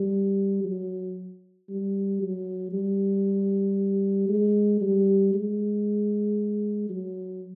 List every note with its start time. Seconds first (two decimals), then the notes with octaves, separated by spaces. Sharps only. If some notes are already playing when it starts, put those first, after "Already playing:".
Already playing: G3
0.64 F#3
1.70 G3
2.22 F#3
2.73 G3
4.29 G#3
4.81 G3
5.34 G#3
6.89 F#3